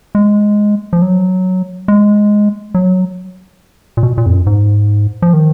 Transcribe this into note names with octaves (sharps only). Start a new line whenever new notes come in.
G#3
F3
F#3
G#3
F#3
A#2
B2
A#2
F2
F#2
G#2
F3
D#3